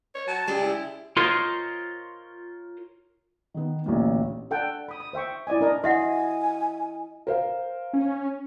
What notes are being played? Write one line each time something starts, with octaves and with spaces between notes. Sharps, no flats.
C#5
F#3 A5
C#3 G#3 G4 D5
E4
F4 A#4 C5 C#5 D#5
D#3 B3
A1 D2 A#2
D4 A4 F#5 G5 A5
B5 D#6
D#6
C5 E5 G5 C#6
E4 D5 D#5 G#5
D4 A#4 D#5
E4 F#4 D#5 E5 F#5 G#5
A#4 C5 F5
C#4